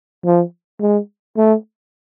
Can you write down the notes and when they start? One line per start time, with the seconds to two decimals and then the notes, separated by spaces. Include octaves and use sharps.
0.25 F3
0.81 G#3
1.37 A3